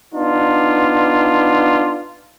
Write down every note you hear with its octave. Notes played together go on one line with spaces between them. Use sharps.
B3 D4 D#4 F4